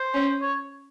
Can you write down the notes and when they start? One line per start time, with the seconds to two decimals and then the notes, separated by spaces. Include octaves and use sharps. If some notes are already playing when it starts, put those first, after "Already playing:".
Already playing: C5
0.14 C#4
0.41 C#5